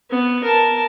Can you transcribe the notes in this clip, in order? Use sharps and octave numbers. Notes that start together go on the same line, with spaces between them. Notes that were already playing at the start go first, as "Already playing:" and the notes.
B3
A#4 A5